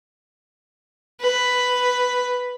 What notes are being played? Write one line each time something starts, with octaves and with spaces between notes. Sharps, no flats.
B4